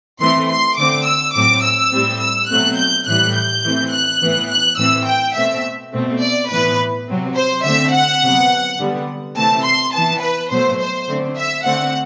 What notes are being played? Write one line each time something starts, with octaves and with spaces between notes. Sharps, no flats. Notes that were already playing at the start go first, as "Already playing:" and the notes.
E3 A3 C4 C6
C6
D3 A3 C4 D6
E6
A2 F#3 C4 D6
E6
A2 G3 C4
E6
B2 F#3 A3 C4 F#6
G6
A2 E3 G3 F#6
G6
E3 A3 C4
F#6
A2 E3 B3
F#6
A2 E3 A3 C4 E6
G5
B2 A3 C4 E5
B2 A3 C4
D5
A2 E3 B3 B4
C3 F#3 C4
C5
D3 A3 C4 E5
F#5
C3 F#3 B3
D3 G3 B3
C3 E3 A3 C4 A5
C6
E3 B3 A5
B4
B2 F#3 A3 C5
C5
D3 A3 C4
E5
D3 A3 C4 F#5